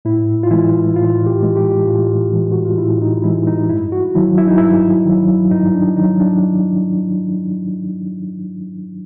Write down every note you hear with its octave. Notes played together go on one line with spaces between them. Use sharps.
A2 E4
F4
E3 G#3 E4
A2 F4
G4
E3 G#3
G4
A2 F4
E3 G#3
F#4
F4
A2 E4
D#4
E3 G#3 E4
D#4
G2 E4
F#4
D#3 F#3 E4
E4
D#4
G2 E4
D#3 F#3
G2 D#4
D4
D#3 F#3 D#4
D4